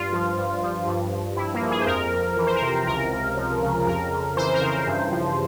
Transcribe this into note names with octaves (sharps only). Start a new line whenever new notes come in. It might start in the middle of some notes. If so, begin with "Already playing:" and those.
Already playing: G2 F4
F3
G2
F3
G2
F3
G2 E4
A#3
F3
G#4
C5
F2 A#4
F2
E3
C5
A#4
C3 C5
C#2 A#4
C#2
F3
C#3
F2 A#4
F2
E3 C5
A#4
C#3
C5
G2
F3